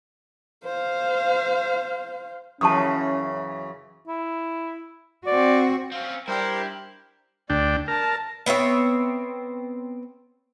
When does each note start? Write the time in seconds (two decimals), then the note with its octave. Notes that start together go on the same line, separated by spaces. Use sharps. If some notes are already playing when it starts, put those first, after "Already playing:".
0.65 C5 F5
2.61 F#2 C#3 E3 C#4 A5 C#6 D#6
4.08 E4
5.26 C4 F#4 D5
5.92 C4 C#4 F5
6.28 G3 D4 E4 G4 A#4 C5 G5
7.50 D2 D4 D5 G5
7.88 A#4 A5
8.46 B3 C4 C#5 E5